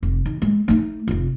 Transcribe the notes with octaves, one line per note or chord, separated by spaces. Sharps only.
F1
D#3
G#3
A3 D#4
F1 F4